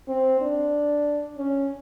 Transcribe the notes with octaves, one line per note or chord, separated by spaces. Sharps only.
C4
D4
C#4